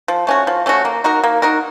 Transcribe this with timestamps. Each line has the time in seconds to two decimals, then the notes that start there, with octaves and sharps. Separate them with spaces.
0.08 F3
0.27 A3 C#4 F#4
0.47 F3
0.66 A3 C#4 F#4
0.85 A#3
1.04 D#4 F#4 A#4
1.24 A#3
1.42 D#4 F#4 A#4